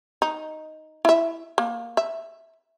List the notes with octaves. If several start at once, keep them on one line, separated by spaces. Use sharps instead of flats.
D#4
E4 E5
A#3
E5